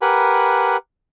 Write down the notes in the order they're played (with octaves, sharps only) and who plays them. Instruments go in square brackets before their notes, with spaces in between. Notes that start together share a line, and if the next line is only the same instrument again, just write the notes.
[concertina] G4 A#4 B4 F#5 G#5 B5